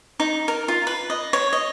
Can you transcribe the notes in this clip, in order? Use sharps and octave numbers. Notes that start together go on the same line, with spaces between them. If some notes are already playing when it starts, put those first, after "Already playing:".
D#4
A#4
F4
B4
D#5
C#5
D#5